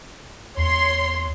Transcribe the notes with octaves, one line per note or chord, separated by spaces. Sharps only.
E2 C#5 C6